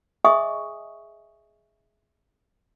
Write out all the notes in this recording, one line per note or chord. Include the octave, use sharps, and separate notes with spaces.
G#4 D#5 E5 G#5 C#6 D#6